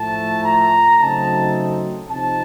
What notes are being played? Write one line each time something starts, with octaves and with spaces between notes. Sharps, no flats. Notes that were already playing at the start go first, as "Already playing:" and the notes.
Already playing: A2 F3 A3 A5
A#5
C#3 F#3 A3 C4 D#4 A5
C3 F3 C4 D#4 A5